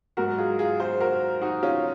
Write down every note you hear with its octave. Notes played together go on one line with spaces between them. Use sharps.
G#2 F#3 F#4 A#4
F4 G#4
F4 G#4
G#4 C5
F#4 A#4
D#4 F#4
C#4 F4